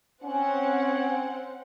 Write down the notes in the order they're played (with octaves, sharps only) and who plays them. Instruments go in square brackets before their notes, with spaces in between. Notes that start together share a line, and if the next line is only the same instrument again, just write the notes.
[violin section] C4 F#5 [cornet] C#4